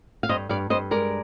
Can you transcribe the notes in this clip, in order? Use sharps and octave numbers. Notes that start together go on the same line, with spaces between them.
F5
G2 C5 D#5
G2 D5 F5
G2 C5 D#5
G#3 A#4 D5